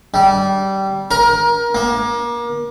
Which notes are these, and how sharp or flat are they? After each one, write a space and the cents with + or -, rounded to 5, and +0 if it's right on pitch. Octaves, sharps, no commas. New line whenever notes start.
G3 -20
A#4 +25
A#3 +30